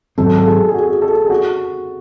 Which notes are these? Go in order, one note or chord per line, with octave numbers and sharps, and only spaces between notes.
G#2 D#3 F#3 C4 A4
A4
G#4
G#4
F#4
G#4
A4
A4
G#4
F#4